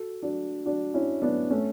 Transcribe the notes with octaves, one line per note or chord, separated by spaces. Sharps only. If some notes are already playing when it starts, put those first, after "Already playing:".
Already playing: F#4 A4
D4 F#4
D4 F#4
C#4 E4
B3 D4
A3 C#4